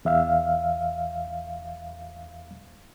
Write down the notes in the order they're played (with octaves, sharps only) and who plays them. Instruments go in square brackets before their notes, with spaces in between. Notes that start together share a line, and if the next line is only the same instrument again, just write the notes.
[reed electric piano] E2 E5 F5